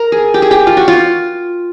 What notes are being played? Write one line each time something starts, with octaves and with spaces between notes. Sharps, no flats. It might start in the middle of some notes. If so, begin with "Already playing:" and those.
Already playing: A#4
G#4
G4
G#4
G4
F4
F#4
F4